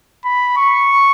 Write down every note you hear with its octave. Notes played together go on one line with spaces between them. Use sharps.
B5
C#6